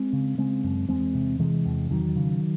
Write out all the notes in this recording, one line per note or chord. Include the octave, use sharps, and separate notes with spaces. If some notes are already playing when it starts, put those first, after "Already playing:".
Already playing: G#3 C4
C#3
C#3 G#3 C4
F#2
E2 G#3 C4
C3
C3 E3 G#3
E2
E2 D#3 F#3
C#3